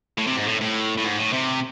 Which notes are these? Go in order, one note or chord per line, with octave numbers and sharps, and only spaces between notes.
A2
C3
G#2
A2
A2
A2
G#2
A2
C3